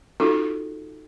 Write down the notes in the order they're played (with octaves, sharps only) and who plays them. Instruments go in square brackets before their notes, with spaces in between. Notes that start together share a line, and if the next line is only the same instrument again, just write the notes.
[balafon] C#4 D#4 F4 F#4 A4